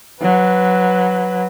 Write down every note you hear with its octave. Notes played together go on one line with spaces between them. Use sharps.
F#3 B4